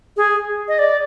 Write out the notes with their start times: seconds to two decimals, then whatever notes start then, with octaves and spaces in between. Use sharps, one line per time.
0.17 G#4
0.68 D#5
0.79 D5